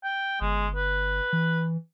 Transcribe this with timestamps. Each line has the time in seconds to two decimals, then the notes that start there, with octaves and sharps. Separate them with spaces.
0.04 G5
0.41 G1 G#3
0.76 B4
1.33 E3